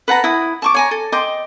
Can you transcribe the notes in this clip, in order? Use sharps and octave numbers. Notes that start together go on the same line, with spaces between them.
B4 F#5 A5 A#5
E4 D#6
A5 C#6 D6
C#5 G#5 A#5
A4
D#5 G5 C6 D6